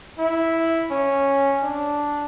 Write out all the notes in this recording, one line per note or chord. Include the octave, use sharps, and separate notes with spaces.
E4
C#4
D4